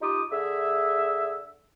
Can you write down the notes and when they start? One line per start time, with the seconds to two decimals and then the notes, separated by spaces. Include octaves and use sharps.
0.02 D#4 F4 G4 D6 D#6
0.32 D3 G#4 E5